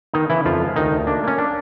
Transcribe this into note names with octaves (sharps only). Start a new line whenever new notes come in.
D#3 B3 D#4
C#3 E3 E4
F2 F3 F4
G#3
D2 D#3 D#4
D2
A#3 D4
A#3 C#4
D4